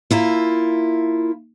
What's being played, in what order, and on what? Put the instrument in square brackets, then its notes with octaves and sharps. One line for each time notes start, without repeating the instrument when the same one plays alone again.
[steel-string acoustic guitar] A#3 E4 F4